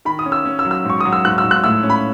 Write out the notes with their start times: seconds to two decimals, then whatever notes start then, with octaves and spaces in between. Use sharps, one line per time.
0.05 D#3 B5
0.19 D#6
0.25 C#4
0.32 E6
0.45 C#4
0.59 E6
0.65 F#3
0.71 E6
0.84 G#2
0.90 C#6
1.00 F#3 D#6
1.13 E6
1.25 G#2 F#6
1.38 E6
1.44 G#2
1.51 F#6
1.64 A2 E6
1.83 C#4
1.90 B5